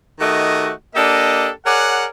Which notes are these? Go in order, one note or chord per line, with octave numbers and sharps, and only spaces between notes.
D#3 A3 D#4 F#4 G4 D#5
A#3 D4 G4 A4 D#5
G#4 A#4 C#5 D5 F#5